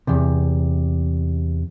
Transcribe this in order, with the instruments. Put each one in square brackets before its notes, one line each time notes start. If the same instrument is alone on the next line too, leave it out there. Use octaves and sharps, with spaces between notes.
[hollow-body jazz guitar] E2 C3